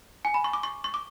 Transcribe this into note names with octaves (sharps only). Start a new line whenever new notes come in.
G#5
B5
C#6
D6
C#6
C#6
D6